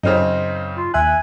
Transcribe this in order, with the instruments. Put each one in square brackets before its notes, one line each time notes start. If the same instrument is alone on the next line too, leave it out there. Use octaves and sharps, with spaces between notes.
[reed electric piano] F#2 F6 [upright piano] C#3 C4 D#4
[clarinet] F4
[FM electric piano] D#2 E5 F#6 [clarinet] G#5